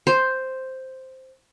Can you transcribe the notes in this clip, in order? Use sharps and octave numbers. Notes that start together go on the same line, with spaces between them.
C5